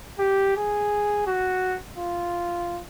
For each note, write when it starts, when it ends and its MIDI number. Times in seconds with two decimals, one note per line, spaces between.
0.19 0.55 67
0.57 1.23 68
1.26 1.78 66
1.98 2.80 65